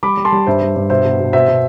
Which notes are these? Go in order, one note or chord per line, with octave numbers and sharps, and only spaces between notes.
G3 B5 D6
G3
A5 C6
G3
G2 C5 E5
G3
G2
B2 C5 E5
B2
B2
B2 C5 E5
B2